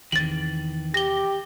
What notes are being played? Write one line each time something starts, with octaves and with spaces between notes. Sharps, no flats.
E2 C3 D#3 E3 A6 F#7
G4 A#6 G7